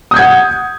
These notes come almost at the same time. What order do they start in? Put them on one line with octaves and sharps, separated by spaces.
D#6 G6 G#6 F#5